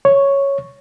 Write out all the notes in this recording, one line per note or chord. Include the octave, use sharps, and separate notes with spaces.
C#5